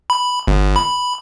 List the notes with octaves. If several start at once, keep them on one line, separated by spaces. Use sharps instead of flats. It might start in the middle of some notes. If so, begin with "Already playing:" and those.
B5
G1
B5